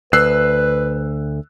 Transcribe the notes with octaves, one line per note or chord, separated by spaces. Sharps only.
D2 B4 E6 F#6 C7